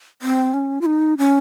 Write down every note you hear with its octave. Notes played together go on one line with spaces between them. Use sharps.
C4
C#4
F4
D#4
C#4